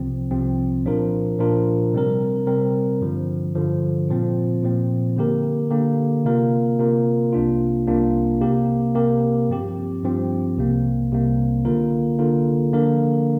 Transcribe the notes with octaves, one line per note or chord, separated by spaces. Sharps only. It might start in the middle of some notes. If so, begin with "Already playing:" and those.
Already playing: C2 C3 F3 C4
C2 C3 F3 C4
A#2 F3 D4 F4 A#4
A#2 F3 D4 F4 A#4
C3 G3 C4 A#4
C3 G3 C4 A#4
G2 D3 F3
G2 D3 F3
A#2 F3 C4
A#2 F3 C4
D3 A#3 G4 A#4
D3 A#3 G4 A#4
C3 A#3 F4 A#4
C3 A#3 F4 A#4
C2 C3 A#3 D4 F4
C2 C3 A#3 D4 F4
C3 A#3 G4 A#4
C3 A#3 G4 A#4
G2 F3 C4 G4
G2 F3 C4 G4
C2 C3 A#3
C2 C3 A#3
D3 A#3 F4 A#4
D3 A#3 F4 A#4
D3 F3 A#3 D4 A#4